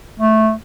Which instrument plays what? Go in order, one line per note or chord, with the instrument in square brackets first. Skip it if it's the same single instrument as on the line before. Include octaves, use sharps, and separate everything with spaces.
[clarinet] A3